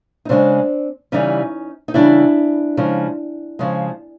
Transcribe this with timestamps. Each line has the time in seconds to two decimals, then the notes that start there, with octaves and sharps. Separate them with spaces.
0.25 D#4
0.29 C#3 F3 G#3 C4 D4
1.12 C#3 E3 G3 C#4 D#4
1.88 D#4
1.94 C#3 E3 G3 D4 E4
2.77 C#3 F3 G#3
3.59 C#3 F3 G#3